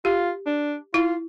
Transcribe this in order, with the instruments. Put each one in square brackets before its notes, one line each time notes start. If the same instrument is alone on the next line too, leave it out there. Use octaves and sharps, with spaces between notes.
[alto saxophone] F4 [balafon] G4
[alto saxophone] D4
[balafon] E4 [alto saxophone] F4